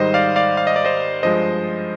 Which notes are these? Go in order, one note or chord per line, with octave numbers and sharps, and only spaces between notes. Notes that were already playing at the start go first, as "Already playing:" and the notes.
Already playing: G#2 D#3 G3 C5 D#5
D5 F5
D5 F5
F5
D#5
D5
C5 D#5
G2 F3 G#3 C5 D#5